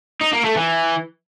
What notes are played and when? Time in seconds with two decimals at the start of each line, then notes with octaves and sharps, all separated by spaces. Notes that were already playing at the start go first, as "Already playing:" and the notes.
0.21 D#4
0.33 A#3
0.45 A3
0.56 E3